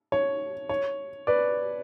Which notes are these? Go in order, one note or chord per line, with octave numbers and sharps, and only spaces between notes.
C#5
C#5
B4 D5